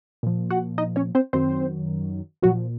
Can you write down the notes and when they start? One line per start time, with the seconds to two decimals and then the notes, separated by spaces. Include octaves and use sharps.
0.23 A#2 F3
0.50 F#4 F#5
0.78 D#4 D#5
0.96 C#4 C#5
1.15 C4 C5
1.33 F#2 D#3 F#3 C4 C5
2.42 A#2 F3 F#3 F#4